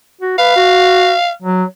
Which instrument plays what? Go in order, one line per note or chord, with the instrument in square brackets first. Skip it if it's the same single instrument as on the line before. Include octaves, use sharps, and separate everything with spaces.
[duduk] F#4
[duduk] B4 [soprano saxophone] F5
[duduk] F#4
F#3